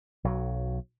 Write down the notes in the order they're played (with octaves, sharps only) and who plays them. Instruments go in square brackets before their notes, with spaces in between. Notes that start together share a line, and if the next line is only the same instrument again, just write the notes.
[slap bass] B1 F#3